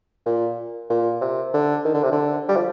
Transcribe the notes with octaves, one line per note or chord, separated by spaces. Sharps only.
A#2
A#2
C3
D3
D#3
D3
C3
D3
G3
F3